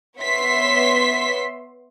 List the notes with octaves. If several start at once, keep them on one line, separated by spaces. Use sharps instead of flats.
B3 C#5 E5 C6 B6